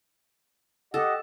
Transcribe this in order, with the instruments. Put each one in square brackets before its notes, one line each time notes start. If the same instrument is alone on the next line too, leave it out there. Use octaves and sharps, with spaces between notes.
[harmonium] G4 D#5 F#5 [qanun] A4